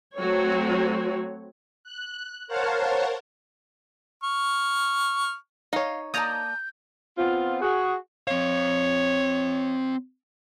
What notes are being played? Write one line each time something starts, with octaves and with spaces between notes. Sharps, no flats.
F#3 A3 C4 F#4 C#5
F#6
A#4 C5 C#5 F5 F#5 A5
C#6 F6
D#4 C#5 D#5 F5
A#3 D5 A5 A#5 D#6 G6
B3 C4 F4
F#4 G#4
C4 C#5 F5